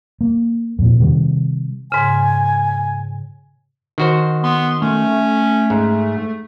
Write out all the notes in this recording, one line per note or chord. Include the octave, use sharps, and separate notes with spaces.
A#3
F2 A#2
C3 D#3 G3
G#2 C#3 G#5
D#3 F#4 C5
B3 C6
A3 C#4
G#2